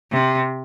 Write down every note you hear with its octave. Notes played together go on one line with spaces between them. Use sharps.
C3